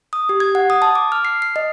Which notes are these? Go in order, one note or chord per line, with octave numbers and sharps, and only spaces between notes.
D#6
G4
G#6
F#5
D#6
A5
D6
F6
C7
C7
D#5